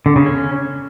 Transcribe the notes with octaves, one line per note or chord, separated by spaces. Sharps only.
D3
C#3
C#4